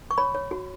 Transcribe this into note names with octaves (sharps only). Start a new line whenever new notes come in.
C#6
C#5 B5
C#5
F#4